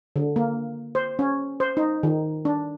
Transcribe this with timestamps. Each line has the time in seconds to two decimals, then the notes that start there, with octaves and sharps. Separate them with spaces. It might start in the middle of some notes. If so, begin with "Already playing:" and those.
0.16 D3
0.36 A#3
0.95 C5
1.19 C#4
1.60 C5
1.77 D#4
2.03 D#3
2.45 D4